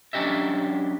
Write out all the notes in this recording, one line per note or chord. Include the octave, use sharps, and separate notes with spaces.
F#3 C#4 D4 G4 D#5 E5